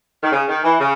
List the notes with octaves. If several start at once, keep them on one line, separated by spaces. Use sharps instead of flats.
D#3
C#3
D#3
E3
C#3